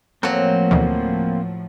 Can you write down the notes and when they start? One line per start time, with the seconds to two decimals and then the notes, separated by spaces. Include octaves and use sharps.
0.23 A2 F3 F#3 A#3 C4 F#4 A4
0.71 D2 B2 E3